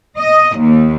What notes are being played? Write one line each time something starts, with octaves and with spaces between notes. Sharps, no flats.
D#5
D#2